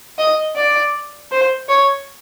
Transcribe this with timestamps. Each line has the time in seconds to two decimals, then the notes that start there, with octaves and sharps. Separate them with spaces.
0.18 D#5
0.56 D5
1.31 C5
1.69 C#5